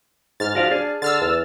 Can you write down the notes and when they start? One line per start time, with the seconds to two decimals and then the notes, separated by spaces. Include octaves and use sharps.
0.40 G#2 F6 A6
0.55 F3 F#4 D5 F5
0.71 D4 G#4
1.02 D3 E6 F6 A6
1.21 E2